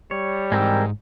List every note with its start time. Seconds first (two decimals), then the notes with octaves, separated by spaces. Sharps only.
0.11 G3 C#5
0.52 G#2 E3 G#3 C4 A#4 G5 E6